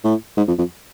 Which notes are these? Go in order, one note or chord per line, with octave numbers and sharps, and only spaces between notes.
A2
G#2
F2
F2